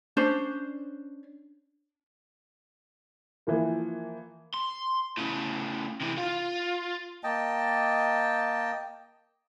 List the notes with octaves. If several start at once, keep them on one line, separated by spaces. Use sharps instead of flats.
C#4 D4 C5
E3 F3 A#3
C6
A2 C#3
C3 E3
F4
A#3 D#5 G5 A5